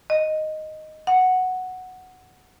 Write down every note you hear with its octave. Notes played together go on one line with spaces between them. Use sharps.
D#5
F#5